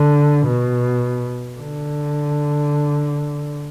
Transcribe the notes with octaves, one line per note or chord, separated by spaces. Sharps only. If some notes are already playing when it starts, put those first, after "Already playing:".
Already playing: D3
B2
D3